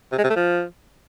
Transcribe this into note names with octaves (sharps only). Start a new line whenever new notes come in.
C3
G#3
C3
A3
F3